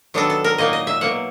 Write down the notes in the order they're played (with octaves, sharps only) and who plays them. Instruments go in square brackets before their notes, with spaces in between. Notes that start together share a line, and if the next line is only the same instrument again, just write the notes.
[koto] D#3 F#3 B3 D4 A4
A4
A#4
A#2 F#3 A#3 D#4 D#5
D#5
E5
B2 F#3 A#3 F#5